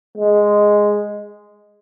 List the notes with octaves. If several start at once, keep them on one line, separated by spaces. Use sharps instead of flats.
G#3